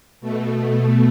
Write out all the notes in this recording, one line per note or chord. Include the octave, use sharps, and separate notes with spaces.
B2 A3